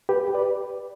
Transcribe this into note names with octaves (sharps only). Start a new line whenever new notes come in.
G4 B4
B4 D5